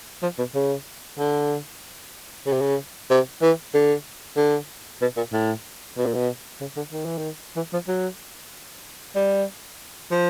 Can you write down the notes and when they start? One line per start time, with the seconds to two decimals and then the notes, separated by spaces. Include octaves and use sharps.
0.23 F3
0.38 B2
0.55 C#3
1.18 D3
2.46 C#3
2.53 C3
2.61 C#3
3.10 C3
3.42 E3
3.74 D3
4.37 D3
5.01 B2
5.17 A#2
5.33 A2
5.97 B2
6.06 A#2
6.15 B2
6.61 C#3
6.77 D3
6.93 D#3
7.05 E3
7.18 D#3
7.56 E3
7.73 F3
7.88 F#3
9.15 G3
10.11 F3